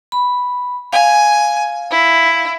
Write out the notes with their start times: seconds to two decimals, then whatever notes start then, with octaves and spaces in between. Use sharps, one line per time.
0.12 B5
0.93 F5 G#5
1.91 E4